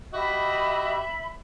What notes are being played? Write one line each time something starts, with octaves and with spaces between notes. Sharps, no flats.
F#4 G4 D#5 E5 B5